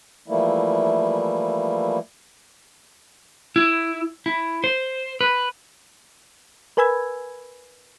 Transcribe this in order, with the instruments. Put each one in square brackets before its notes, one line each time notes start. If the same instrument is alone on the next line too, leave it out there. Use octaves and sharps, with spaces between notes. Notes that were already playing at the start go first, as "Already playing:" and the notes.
[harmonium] E3 F3 G3 A3 A#3 E4
[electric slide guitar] E4
E4
C5
B4
[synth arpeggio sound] A#4 B4 G#5 B5 E6 G#6